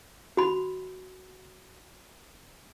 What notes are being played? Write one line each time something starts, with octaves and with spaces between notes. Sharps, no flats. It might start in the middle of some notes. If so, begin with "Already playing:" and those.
F#4 B5